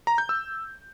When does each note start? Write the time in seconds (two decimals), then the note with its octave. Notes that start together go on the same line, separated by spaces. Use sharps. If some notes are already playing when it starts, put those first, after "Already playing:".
0.07 A#5
0.18 G6
0.29 E6